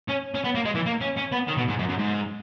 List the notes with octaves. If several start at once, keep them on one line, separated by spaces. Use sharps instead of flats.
C#4
C#4
B3
A#3
G#3
E3
A#3
C#4
C#4
B3
D#3
B2
G#2
F#2
F#2
G#2